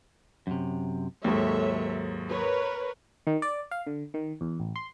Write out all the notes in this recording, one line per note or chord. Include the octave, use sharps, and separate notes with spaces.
F#2 C3
D#2 G#2 F#3 A4 C#5 E5
A#4 B4 C#5
D#3
D5
F5
D3
D#3
E2
A1
C6